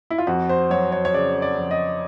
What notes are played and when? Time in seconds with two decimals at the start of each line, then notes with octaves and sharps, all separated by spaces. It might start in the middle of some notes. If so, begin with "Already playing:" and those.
0.10 E4
0.18 F4
0.27 F2 F#4
0.49 C5
0.70 F#3 C#5
0.92 C#5
1.05 C#5
1.14 C#3 D5
1.42 D5
1.57 F2
1.71 D#5